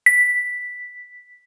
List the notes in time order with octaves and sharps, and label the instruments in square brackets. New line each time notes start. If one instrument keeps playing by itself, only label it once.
[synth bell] B6